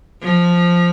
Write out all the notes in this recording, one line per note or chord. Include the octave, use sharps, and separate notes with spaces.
F3